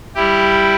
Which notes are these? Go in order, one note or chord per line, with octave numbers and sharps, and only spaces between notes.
G3 E4 G4